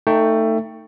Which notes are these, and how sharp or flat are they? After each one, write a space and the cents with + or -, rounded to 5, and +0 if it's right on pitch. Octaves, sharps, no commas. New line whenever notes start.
A3 +20 D#4 +0 G5 +0